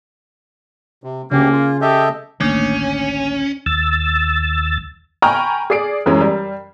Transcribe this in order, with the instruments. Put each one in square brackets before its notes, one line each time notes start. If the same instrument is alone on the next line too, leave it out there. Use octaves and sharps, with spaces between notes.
[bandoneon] C3
[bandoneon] D2 G4 [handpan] C#3 C#4 [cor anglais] A#3
[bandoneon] F4
[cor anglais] G4 [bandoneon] A4 D#5 E5
[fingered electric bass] A1 D2 D#3 [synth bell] A3 A#3 D4 [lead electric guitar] C#4
[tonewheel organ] D#2 E6 A6
[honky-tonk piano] G5 G#5 A#5 B5 C#6 F6
G#4 D5 C7 D7
F#2 E3 G#3 C#4
G3